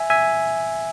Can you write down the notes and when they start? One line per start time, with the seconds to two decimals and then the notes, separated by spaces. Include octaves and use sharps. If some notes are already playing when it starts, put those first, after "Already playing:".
Already playing: E5 G#5
0.10 E5 G#5